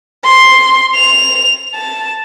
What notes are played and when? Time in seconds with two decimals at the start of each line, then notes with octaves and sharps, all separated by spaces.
0.25 C6
0.95 F7
1.75 A5